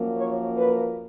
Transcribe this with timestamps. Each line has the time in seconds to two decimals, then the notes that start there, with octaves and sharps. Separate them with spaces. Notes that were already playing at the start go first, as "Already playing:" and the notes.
Already playing: F#2 F3 A#3
0.16 C#5
0.57 B4